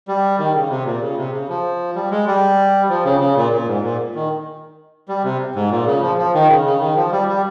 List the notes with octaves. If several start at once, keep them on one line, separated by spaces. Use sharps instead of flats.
G3
D#3
C#3
C3
A#2
C#3
C3
C#3
F3
G3
G#3
G3
F3
C#3
C#3
A#2
A#2
G#2
A#2
D#3
G3
C3
G#2
A#2
C#3
F3
F3
D#3
C#3
C#3
D#3
F3
G3
G3